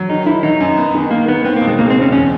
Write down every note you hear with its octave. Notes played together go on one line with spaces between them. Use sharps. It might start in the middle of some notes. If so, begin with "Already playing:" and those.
Already playing: F#3
D#3 D#4
D#3 E4
F#3 D#4
F#2
B3
D#3
D#3 A#3
D#3 B3
B3 C4
A#3
B2
G#3
C#2 A#3
C4
G#3
C#4
E2 C#4